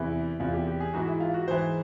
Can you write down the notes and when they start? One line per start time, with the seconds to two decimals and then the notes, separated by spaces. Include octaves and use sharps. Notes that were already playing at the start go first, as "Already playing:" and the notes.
Already playing: E2 C3 E3 E4
0.39 E2 C3 E3 F4
0.54 G4
0.67 G4
0.80 G#4
0.93 G#2 E3 F#4
1.08 E4
1.20 F4
1.34 F#4
1.48 G#2 E3 C5